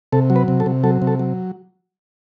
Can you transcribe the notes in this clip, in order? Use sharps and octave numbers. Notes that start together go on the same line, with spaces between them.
C3 A4
F#3
B4
C3
A4
C3
F#3 A4
C3
A4
F#3